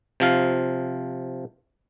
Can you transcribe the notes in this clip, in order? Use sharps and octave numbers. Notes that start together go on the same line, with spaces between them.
C3 F3 F5